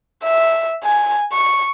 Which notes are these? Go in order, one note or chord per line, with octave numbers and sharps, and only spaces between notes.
E5
G#5
C#6